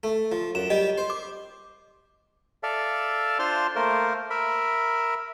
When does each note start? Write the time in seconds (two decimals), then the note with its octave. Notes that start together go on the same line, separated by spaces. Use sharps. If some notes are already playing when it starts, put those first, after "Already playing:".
0.03 A3
0.32 F3
0.55 F#2 E7
0.70 G3 G4 D#5
0.98 C5
1.10 D6
2.63 A4 D5 E5 F5
3.39 D4 F4 C5 A5 C6 F6
3.76 A3 A#3 A#4 C5
4.30 A#4 E5 B5